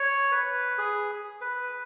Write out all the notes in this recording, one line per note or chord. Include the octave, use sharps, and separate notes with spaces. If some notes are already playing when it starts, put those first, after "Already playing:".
Already playing: C#5
B4
G#4
B4